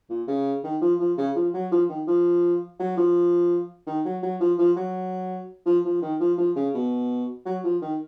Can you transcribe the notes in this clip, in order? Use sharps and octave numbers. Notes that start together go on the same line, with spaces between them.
A#2
C#3
D#3
F3
F3
C#3
F3
F#3
F3
D#3
F3
F#3
F3
D#3
F#3
F#3
F3
F3
F#3
F3
F3
D#3
F3
F3
C#3
B2
F#3
F3
D#3